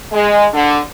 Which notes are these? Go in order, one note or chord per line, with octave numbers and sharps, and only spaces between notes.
G#3
D3